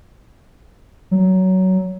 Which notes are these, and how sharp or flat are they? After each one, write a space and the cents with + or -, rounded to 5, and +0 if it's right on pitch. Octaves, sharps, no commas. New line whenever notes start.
F#3 +15